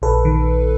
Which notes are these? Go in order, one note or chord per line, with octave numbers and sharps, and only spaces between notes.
A#1 A4 B4
D#3